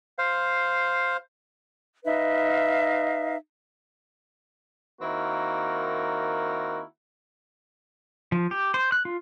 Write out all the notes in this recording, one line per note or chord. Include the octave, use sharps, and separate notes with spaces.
C5 F5
D#4 B4 E5 F5
D#3 A#3 C4 E4 F#4 A#4
F3
G4
C5
F#6
F4